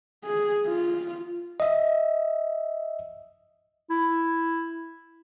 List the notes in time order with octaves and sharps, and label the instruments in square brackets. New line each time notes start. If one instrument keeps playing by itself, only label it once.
[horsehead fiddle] G#4
F4
[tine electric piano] D#5 E5
[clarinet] E4